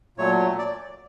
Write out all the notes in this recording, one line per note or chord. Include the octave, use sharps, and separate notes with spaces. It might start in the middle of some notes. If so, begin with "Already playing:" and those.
A#2 F#3 A3 C#5
D5